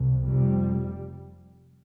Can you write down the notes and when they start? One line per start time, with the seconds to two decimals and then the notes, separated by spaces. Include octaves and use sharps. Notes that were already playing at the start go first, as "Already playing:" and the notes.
Already playing: C2
0.24 F1 F2 C3 G3